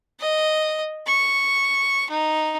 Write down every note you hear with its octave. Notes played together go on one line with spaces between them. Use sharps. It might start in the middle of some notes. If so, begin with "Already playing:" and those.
D#5
C#6
D#4